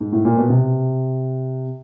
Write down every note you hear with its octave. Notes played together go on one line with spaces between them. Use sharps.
G#2
A2
A#2
B2
C3